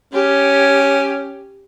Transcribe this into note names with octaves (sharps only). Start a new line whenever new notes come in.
C#4 G4